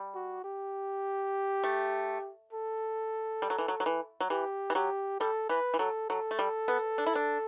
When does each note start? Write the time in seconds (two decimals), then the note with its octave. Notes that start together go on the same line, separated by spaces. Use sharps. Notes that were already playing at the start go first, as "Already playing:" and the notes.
Already playing: G3
0.15 F#4
0.44 G4
1.64 A3
2.53 A4
3.42 G3
3.50 F#3
3.58 E3
3.68 F#3
3.80 F#3
3.86 E3
4.20 F#3
4.30 E3 G4
4.70 E3
4.75 F#3 G4
5.20 G3 A4
5.49 E3 B4
5.74 E3
5.79 F#3 A4
6.10 F#3 A4
6.31 A3
6.39 G3
6.68 B3
6.98 D4
7.06 E4
7.15 D4